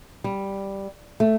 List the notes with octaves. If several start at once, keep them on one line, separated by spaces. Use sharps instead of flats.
G3
A3